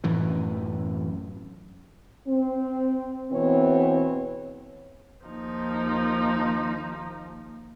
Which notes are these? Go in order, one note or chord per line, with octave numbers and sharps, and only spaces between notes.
A1 F#2 A2 E3
C4
E2 B2 E3 B3 C4 C#5
D#2 F3 D#4